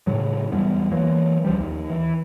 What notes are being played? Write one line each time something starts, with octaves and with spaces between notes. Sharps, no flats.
A2 C#3 F#3
E2 G3 B3
E3 F#3 A#3
C#2 F3 G3
D#2
E3